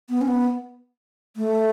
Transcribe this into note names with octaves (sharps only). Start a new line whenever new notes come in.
B3
C#4
B3
A3